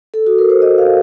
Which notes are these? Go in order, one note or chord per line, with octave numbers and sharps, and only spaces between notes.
A4
F#4
A#4
C5
D#5
F5